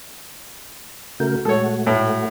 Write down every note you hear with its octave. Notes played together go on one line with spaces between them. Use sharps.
C#3 A3 F#4 A#4 G6
A#2 G#3 A3 F#4 A4 C#5
A2